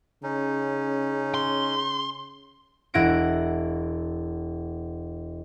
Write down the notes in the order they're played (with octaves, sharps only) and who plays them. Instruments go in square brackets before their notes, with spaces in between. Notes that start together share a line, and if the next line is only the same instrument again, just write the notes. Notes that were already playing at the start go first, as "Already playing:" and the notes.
[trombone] C#3 [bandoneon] C#4 D#4
[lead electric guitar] C6
[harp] E1 E4 F#5 A#6 D7